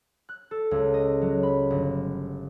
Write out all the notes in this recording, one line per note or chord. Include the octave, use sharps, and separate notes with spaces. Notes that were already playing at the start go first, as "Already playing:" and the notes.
F#6
A4
C#2
D#5
F#3
B5
G1